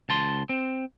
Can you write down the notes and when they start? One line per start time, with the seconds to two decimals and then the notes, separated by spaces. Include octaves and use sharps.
0.09 C#2 A5 C6
0.49 C4